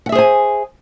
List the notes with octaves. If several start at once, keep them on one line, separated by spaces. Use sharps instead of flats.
G#4 C5 E5 F#5 G#5